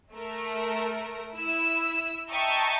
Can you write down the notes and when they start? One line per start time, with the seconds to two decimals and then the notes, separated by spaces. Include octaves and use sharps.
0.13 A3 A#4
1.33 E4 E6
2.30 D#5 E5 G5 A5 A#5 C#6